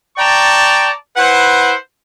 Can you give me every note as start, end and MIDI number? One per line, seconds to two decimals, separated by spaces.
0.17 0.89 74
0.17 0.89 79
0.17 0.89 81
0.17 0.89 82
0.17 0.89 85
1.16 1.73 64
1.16 1.73 71
1.16 1.73 72
1.16 1.73 78